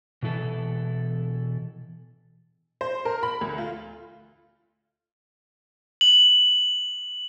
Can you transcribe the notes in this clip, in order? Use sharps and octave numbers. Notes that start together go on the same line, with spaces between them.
B2 E3 E4 A4
C5
A#4
B5
D2
F4
F#7